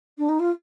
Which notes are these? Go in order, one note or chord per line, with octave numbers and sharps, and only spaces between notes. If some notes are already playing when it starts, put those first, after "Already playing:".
D4
D#4
F4